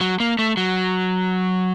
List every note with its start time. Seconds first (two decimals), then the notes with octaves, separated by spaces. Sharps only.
0.01 F#3
0.20 A#3
0.39 A3
0.57 F#3